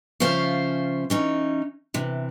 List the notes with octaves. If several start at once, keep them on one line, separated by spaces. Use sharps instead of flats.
C#3 F3 C#4 C5 E5 F5
E3 C#4 D#4
C3 E3